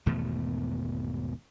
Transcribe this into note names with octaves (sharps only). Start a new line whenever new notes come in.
G#1 E2 B2 A3